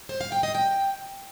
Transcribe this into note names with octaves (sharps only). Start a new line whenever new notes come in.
C5
F5
G5
D#5
G5